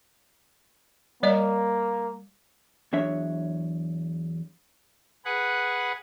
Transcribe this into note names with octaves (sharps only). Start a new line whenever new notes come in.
G3 A#3 D5 D#5
E2 F#3 D4 C#5 E5
G#4 B4 F#5